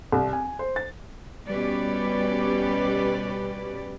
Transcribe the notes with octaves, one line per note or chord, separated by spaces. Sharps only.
C2
G#5
C5
A6
B2 G3 C#4 G4 B4 D5